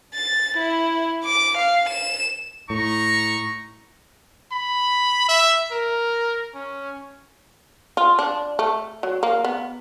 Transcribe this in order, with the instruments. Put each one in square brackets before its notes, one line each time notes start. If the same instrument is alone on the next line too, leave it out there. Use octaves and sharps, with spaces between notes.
[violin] A6
E4
D6
F5
E7
[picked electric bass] A2 [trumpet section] D#4 C#6 [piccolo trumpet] A#5
[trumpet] B5
E5
A#4
C#4
[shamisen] F4
D4
A3
F#3
A#3
B3